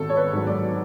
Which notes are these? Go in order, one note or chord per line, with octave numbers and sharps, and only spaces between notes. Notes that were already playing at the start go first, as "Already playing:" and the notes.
Already playing: G#1 A4
C#5
B4
G#2 F#3
D5